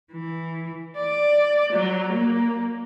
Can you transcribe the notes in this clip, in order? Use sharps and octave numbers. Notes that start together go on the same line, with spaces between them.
E3
D5
F#3
A#3